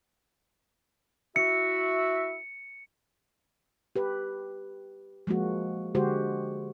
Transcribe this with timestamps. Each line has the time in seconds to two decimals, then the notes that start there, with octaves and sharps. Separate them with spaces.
1.36 E4 F#4 E5 C#7
3.96 G4 B4
5.27 F3 G#3 A#3 F#4
5.95 D3 G#3 F#4 G4 C5